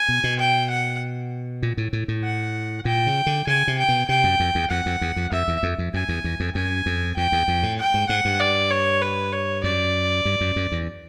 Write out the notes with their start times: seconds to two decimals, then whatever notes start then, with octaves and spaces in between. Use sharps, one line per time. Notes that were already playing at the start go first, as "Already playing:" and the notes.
Already playing: G#5
0.08 B2
0.24 B2
0.39 G5
0.70 F#5
1.63 A#2
1.77 A2
1.93 A2
2.08 A2
2.24 F#5
2.85 A#2 G5
3.07 C#3
3.26 D3
3.47 C#3 G#5
3.68 C3
3.79 G5
3.89 B2
4.09 C3 G5
4.24 F#2
4.40 F2
4.55 E2
4.70 F2 F#5
4.86 F2
5.01 E2
5.16 F2
5.32 F2 E5
5.48 E2
5.63 F2
5.78 F2
5.94 F#2 G#5
6.09 E2
6.24 E2
6.40 F2
6.55 F#2 G#5
6.86 F2
7.17 F2 G5
7.32 E2
7.48 F2
7.63 A2
7.79 G5
7.94 G#2
8.09 G#2 F#5
8.25 G2
8.40 D5
8.71 C#5
9.02 B4
9.33 C#5
9.64 F#2 D5
10.25 G2
10.41 F#2
10.56 F#2
10.72 E2